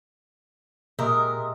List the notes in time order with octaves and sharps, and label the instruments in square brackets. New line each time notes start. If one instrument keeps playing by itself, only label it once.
[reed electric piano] A#2 [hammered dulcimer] G#3 D#5 E5 [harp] G4 A#5 [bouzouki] A#4